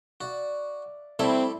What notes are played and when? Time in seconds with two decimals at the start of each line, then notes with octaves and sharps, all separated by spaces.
0.21 F#4 D5 E5 F5
1.19 G3 A3 C4 E4 A4